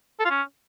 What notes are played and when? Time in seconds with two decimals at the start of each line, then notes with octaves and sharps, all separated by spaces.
0.20 A4
0.25 F4
0.30 C#4